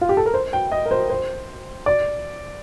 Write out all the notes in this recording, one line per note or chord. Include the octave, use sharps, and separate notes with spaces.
F4
G4
A4
A#4
C5
G5
D#5
A#4
C5
C5
D5